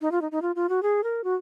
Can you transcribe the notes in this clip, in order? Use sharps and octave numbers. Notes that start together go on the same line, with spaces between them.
D#4
F4
D#4
D#4
F4
F4
F#4
G#4
A#4
F#4